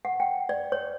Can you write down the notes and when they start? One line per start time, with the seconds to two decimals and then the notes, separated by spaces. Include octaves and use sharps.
0.05 F#5
0.20 G5
0.49 D5
0.72 C#5